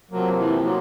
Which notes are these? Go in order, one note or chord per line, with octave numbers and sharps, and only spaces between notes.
C3 F3 F#3 A#3
E3
F3 F#3 A#3